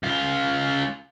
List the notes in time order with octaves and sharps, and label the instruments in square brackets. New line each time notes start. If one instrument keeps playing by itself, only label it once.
[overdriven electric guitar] C#2 F4